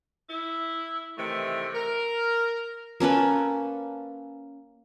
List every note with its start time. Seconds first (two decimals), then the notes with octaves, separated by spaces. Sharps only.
0.29 E4
1.18 C3 D#3 E3 A3
1.75 A#4
3.00 A#3 C#4 A4 B4